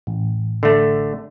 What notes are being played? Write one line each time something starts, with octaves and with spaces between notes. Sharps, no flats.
A1
D3 A3